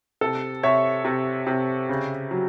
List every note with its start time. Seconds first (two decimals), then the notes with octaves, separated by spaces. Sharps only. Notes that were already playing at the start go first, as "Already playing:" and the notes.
0.21 C3 A4
0.63 C3 C#5 E5
1.05 C3
1.47 C3
1.89 C#3
2.31 F#3